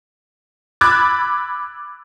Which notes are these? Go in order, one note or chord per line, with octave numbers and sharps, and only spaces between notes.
B5 D6 E6 F#6 G#6 A6